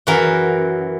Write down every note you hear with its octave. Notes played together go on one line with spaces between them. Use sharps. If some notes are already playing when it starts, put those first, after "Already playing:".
F#2 E3 F#4 A#4